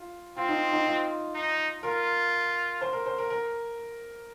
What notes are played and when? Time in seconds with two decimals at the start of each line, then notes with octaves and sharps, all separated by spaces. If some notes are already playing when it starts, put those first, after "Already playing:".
Already playing: F4
0.36 C4 F4
0.48 D#4
0.72 D#4
0.86 F4
1.34 D#4
1.83 F4 A#4
2.81 C5
2.93 A#4
3.06 C5
3.18 A#4
3.30 A#4